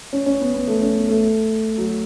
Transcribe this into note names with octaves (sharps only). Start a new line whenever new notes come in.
C#4
C#4
B3
B3
A3
C#4
B3
A3
F#3